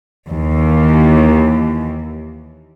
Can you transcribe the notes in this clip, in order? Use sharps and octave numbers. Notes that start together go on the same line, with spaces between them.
D#2 E3